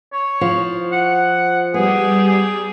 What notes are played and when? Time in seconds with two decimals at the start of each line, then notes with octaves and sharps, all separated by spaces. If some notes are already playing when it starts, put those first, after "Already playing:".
0.13 C#5
0.41 F3
0.92 F#5
1.74 G3 B3 G4 G#4
2.27 G#4